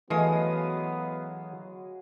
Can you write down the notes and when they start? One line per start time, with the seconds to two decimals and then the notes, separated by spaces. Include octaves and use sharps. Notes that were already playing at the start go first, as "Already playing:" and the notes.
0.10 E3 F#3 G#3 A3 B3 F5 D#6